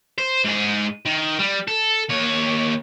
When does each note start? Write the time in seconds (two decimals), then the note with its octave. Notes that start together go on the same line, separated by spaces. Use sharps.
0.18 C5
0.44 G#2 G#4
1.05 D#3
1.39 G3
1.68 A4
2.09 D#2 C#5